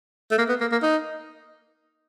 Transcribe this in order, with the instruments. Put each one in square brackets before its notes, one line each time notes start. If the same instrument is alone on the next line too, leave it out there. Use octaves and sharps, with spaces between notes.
[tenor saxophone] A3
A#3
B3
A#3
A#3
D#4